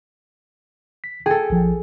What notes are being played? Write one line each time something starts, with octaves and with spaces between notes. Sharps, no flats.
B6
G#4 A4 G5
A#1 F3